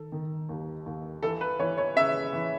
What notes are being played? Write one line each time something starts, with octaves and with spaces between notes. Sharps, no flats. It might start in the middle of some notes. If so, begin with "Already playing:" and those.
Already playing: D#3 A4
D#3
D#2
D#2
E3 A4
B4
E3 C#5
C#5
C#3 E5
E3